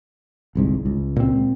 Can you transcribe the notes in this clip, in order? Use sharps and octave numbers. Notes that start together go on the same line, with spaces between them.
G1 C2 G#2
C#2
A#2 C4